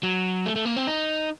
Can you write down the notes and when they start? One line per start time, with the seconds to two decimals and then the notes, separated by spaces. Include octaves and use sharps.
0.03 F#3
0.45 A3
0.56 A3
0.65 A#3
0.76 C4
0.87 D#4